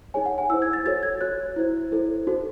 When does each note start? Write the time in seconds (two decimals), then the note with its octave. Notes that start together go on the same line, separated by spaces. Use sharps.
0.14 D#4 G#4 C#5 G#5
0.26 F#5
0.38 G#5
0.50 E4 E6
0.54 C5
0.62 G#6
0.73 A6
0.85 F#4 A4 C#5 A6
1.03 G#6
1.21 F#4 C#5 F#6
1.56 E4 C5
1.92 E4 A4 C5
2.27 D#4 F#4 A4 C5